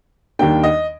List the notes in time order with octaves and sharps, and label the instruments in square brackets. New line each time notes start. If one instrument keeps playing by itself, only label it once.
[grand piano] D#2 D#3 G3 A#3 D4 G5
D#5